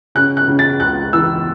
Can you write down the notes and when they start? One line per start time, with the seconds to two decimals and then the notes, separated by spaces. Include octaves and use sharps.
0.15 C#3 F#6
0.37 F#6
0.48 C#3
0.59 A6
0.80 C#2 F#6
1.13 E3 E6